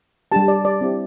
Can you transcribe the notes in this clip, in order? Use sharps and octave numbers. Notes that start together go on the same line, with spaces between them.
G3 D4 G4 A5
D5
D5
C4 E4 G4